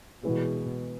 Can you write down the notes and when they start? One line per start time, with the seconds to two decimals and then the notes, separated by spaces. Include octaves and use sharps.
0.23 B2 E3 G#3 B3 E4 G#4